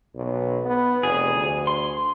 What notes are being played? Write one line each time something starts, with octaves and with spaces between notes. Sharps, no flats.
B1
B3
F1 G#4
D2
C6